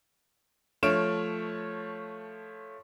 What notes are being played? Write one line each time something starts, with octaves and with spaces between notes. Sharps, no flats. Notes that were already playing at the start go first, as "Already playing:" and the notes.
F3 A3 C#5 F6 D7 E7